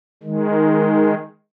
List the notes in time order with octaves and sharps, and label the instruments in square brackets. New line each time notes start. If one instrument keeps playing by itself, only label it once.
[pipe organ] D#3 G#3